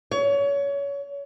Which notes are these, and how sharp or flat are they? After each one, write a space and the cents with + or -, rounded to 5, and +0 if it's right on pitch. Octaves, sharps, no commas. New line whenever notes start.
C#5 +25